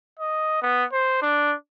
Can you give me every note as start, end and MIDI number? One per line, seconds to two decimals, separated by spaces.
0.19 0.62 75
0.62 0.85 59
0.92 1.17 72
1.22 1.54 62